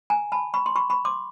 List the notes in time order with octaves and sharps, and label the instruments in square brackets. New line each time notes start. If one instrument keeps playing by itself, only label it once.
[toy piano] G#5 A#5
A5 B5
B5 C#6
C6
B5 C#6
B5 C#6
C6 D6